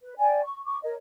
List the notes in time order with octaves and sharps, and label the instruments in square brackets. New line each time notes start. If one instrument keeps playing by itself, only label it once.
[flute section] B4
D5 G5 G#5
C#6
C#6 D6
A#4 C#5 D#5